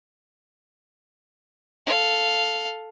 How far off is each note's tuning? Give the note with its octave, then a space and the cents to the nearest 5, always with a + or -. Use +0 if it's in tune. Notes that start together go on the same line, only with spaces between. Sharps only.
A4 +0 F5 +0